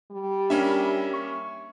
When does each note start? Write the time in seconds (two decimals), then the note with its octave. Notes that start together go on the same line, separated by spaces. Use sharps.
0.11 G3
0.50 A#3 C#4 D4 E5 B5
1.14 C#6